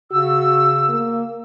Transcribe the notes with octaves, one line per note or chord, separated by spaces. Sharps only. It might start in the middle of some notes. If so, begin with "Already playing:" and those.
C#3 F#4 E6
A#3